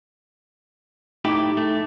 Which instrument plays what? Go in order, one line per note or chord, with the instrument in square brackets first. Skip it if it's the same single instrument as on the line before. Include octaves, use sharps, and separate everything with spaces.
[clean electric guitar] A2 E4 G4 [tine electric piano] D#4 D6
[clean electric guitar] A3